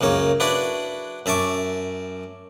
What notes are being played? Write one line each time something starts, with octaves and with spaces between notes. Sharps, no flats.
C#2 F#2 A#3 C#5
D4 E4 F#4 B4 D5
F#2 E5 A5 C#6 D6